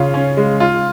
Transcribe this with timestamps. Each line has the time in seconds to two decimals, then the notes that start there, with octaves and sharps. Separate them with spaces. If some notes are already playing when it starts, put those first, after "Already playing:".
Already playing: C#3 F4
0.14 C#4
0.37 G#3
0.60 F4